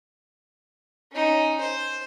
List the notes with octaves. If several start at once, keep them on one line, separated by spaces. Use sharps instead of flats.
C#4 D#4
C5